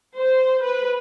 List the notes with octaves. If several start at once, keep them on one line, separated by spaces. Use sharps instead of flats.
C5
B4